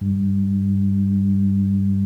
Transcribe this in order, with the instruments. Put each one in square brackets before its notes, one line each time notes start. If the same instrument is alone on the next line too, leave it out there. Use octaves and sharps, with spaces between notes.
[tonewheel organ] G2